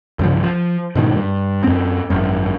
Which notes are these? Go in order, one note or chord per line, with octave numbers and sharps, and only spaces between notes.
C2 G2 C#3 F3
F3
G#2 B2 D#3
G2
F#2 C4
G#1 F#2